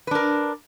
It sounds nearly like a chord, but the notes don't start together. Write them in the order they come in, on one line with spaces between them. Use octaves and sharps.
B4 D4 A#4